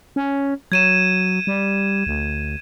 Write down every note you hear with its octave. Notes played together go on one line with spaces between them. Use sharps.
C#4
F#3 G#6 D#7 E7
G3
D2